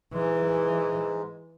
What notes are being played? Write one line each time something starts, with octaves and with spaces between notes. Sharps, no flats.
G#2 E3 G#3